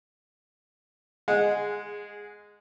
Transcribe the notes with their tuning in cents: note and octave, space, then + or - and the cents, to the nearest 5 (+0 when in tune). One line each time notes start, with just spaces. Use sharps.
G#3 -10 G#4 +5 F#5 -25